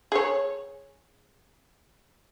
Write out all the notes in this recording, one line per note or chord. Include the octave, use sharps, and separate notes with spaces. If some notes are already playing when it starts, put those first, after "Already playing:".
G#4 C#5